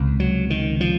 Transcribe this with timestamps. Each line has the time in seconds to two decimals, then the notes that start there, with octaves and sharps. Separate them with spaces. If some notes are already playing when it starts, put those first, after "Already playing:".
Already playing: C#2 C3
0.20 F#3
0.50 D#3
0.81 F3